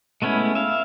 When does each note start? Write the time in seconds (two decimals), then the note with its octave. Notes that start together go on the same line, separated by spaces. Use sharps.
0.22 G#3 A3 B3 C#4 E4
0.55 E5 F5